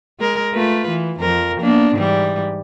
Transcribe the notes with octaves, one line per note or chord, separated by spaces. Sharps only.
G#3 A#4
A3 F4 B4
E3
F2 F3 A#4
A#3 B3 D4
G#2 E3 G3